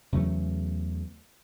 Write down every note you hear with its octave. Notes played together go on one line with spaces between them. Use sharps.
E2 C#3 F#3 A3